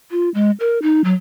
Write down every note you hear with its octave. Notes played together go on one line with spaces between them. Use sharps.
F4
G#3
A#4
D#4
F#3